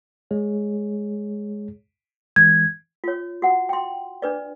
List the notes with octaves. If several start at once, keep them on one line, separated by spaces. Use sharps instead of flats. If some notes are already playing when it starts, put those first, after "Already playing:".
G#3 G#4 C#5
E3 G#3 G#6
F4 C#5
F#4 F#5
G5 C6
D4 B4 D5